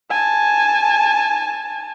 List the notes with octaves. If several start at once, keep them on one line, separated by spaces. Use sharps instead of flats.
G#5 A5